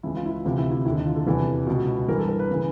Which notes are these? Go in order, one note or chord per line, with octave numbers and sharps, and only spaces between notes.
C#2 C#3 E3 E4
F4
E4
F4
D2 C3 E3 F4
E4
E4
D#2 D3 E4
D#4
F4
A4
E2 C3 E3 A4
C#2 B2
G2 E3 A#4
A4
A#4
B4
C#3 E3